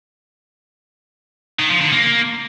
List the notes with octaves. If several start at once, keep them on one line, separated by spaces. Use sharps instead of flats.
D#3
F3
D3
A#3